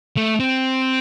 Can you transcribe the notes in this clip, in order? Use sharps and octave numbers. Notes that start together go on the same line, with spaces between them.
A3
C4